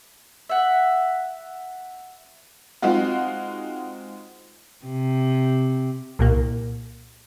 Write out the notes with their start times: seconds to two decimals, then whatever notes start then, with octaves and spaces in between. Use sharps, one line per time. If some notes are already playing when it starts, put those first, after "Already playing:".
0.49 E5 F#5
2.82 G#3 C4 D#4 F4 F#4
4.86 C3
6.19 C2 A#2 A#3